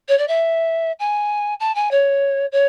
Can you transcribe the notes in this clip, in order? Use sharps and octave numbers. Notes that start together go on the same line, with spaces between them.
C#5
D5
E5
G#5
A5
G#5
C#5
C#5